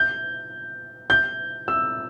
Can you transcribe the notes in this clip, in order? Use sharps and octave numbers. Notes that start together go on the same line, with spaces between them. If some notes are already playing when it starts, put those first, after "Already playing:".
Already playing: G6
G6
E6